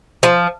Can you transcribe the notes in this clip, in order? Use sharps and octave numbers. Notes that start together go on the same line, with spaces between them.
F3